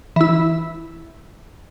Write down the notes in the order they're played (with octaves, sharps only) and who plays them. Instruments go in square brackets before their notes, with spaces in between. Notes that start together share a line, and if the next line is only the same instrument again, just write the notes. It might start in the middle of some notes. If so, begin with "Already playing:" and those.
[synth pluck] E3 E4